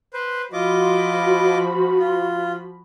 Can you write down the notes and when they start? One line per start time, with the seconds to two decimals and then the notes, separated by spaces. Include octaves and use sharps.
0.14 B4 C5
0.53 F3 F4 F#4 D#5 B5 D6
2.00 F4